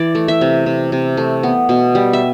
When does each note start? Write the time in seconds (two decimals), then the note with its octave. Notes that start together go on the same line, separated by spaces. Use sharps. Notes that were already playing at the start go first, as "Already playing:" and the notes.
Already playing: E3 D5
0.15 A3
0.28 E5
0.41 C3
0.66 C3
0.92 C3
1.17 A3
1.43 B3
1.69 B2
1.95 G3
2.13 E5